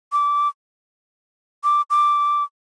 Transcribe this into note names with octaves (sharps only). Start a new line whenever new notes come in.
D6
D6
D6